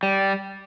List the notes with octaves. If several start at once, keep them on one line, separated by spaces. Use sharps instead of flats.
G3